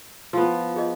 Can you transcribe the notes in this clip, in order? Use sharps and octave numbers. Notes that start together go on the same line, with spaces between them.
F3 B3
F4 G#4 D#5